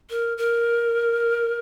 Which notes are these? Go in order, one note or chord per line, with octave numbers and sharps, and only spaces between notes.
A#4
A#4